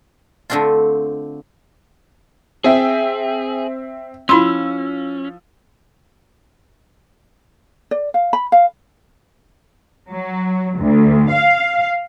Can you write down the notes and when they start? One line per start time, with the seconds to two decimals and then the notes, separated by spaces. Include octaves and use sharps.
0.50 D3 A3 C4 D4 F4
2.64 C4 G#4 E5 G5
4.29 F3 C#4 E4 B5 C6 E6
7.91 D5
8.14 F5
8.33 B5
8.52 F5
10.10 F#3
10.79 D2
11.31 F5